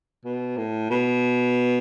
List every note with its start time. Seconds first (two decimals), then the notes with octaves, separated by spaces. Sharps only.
0.25 B2
0.57 A2
0.90 B2